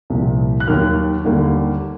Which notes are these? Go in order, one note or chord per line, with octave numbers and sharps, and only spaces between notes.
C2 A#2 F3
F#6
D#2 D#3 F#3 A#3 F6
D#2 D3 G3 A#3